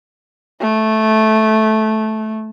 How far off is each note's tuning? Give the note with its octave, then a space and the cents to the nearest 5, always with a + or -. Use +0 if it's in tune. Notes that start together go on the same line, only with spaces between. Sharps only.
A3 -10